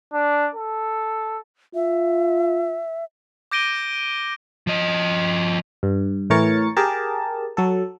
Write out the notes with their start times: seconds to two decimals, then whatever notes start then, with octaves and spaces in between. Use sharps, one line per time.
0.13 D4
0.55 A4
1.75 F4 E5
3.51 D6 G6 A#6 D7 D#7 G7
4.67 F3 D#5
5.83 G2
6.30 A2 E3 A#4 C#5 A6 C#7
6.77 G4 G#4 A#4 A5
7.57 F#3 A4